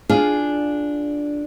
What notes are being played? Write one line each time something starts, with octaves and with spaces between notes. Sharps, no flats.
D4 F4 G#4 F5